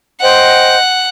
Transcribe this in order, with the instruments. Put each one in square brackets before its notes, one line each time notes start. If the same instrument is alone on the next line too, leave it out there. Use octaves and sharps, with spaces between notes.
[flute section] C5 D#5 G5 [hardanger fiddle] F#5